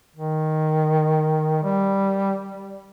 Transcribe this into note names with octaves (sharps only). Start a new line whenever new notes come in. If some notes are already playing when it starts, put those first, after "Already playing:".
D#3
G3